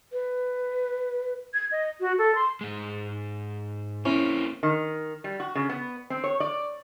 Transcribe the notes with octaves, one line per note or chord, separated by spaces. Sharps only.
B4
G#6
D#5
F#4
A4
C6
G#2 G#3
A#3 C4 C#4 E4
D#3
G3
F#4
C#3
B3
C4
C#5
D5